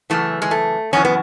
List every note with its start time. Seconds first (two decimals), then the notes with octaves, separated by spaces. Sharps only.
0.10 F#2 C#3 E3 A3
0.42 G#3
0.51 A3
0.93 F#2 C#3 E3 C#4
1.05 B3